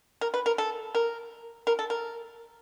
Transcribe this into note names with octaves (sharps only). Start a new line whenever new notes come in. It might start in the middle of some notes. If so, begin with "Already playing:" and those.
A#4
B4
A#4
A4
A#4
A#4
A4
A#4